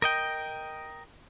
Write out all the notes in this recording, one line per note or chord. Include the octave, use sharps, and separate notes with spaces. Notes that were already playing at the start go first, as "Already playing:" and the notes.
A#4 D#5 G5